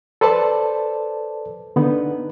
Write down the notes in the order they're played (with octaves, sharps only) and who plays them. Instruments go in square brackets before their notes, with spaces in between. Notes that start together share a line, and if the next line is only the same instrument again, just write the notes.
[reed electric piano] A4 B4 C5 D5 A5
D3 B3 D#4